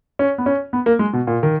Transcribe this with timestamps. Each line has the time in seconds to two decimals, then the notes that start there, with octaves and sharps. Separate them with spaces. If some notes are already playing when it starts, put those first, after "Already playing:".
0.19 C#4
0.38 B3
0.46 C#4
0.73 B3
0.86 A#3
0.99 G#3
1.13 B2
1.27 A#2
1.43 D#3